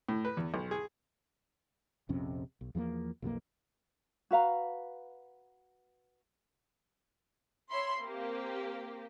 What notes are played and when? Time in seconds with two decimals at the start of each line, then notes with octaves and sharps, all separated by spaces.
0.09 A2
0.25 B4
0.37 E2
0.54 B1
0.71 G#4
2.09 A#1 F2 C3 C#4
2.61 B1
2.75 E2 F3 G3 A#3
3.22 B1 F2 E3 A#3
4.31 F#4 B4 F5 A#5
7.69 C#5 E5 B5 C6
8.00 A#3 C4 G4